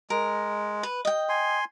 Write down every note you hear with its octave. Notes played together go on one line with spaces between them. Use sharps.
G#3 A#4
B4
D#5 G5
G#5 C6